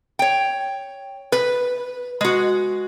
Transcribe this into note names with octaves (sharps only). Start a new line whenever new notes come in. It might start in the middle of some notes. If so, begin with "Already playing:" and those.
C#5 G5
B4
G#3 F#4